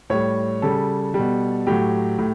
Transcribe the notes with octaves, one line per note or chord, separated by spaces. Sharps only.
A2 G3 C#5
C#3 G3 A4
B2 G3
A2 F#3 G4
A2